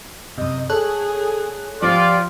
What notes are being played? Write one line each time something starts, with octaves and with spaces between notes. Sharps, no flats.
F#2 C3 D#5
G#4 A4 C#5 F#6
F3 F4 G4 D5